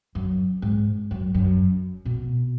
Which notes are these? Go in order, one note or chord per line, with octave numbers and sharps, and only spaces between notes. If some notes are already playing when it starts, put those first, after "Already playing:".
F#2
G#2
F#2
F#2
B2